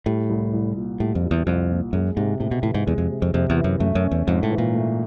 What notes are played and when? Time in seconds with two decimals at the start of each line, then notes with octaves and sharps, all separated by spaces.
0.06 A2 G3
0.29 C2
0.53 C2
0.76 A#2
1.00 A2 G3
1.15 F2
1.24 C2
1.31 E2
1.47 C2 F2
1.70 A#2
1.93 F#2 G#3
2.16 G#2 C3
2.40 A2 C3
2.51 B2
2.63 A2 E3
2.75 G#2
2.86 E2 G#3
2.98 F2
3.10 C3
3.22 F2
3.34 F2 C3
3.50 E2
3.57 E3
3.64 F#2
3.80 F#2 A3
3.95 F#2
4.03 C#4
4.12 E2
4.27 F2 G#2
4.43 A2
4.50 E3
4.58 A#2
4.74 A3